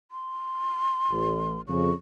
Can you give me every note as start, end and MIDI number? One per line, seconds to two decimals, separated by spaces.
0.11 1.61 84
1.11 1.57 33
1.68 1.90 41
1.68 1.90 49
1.68 1.91 85